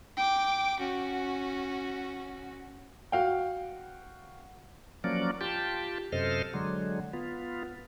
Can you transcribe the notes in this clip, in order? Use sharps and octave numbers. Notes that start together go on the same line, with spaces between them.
G5 D6
C#4 F#4
F#4 F5 G5
F3 F#3 A#3 C#4 D5
F4 G4 G5 A5
F#2 C3 A4 C5 D#5 F6
D3 F#3 G#3
B3 F4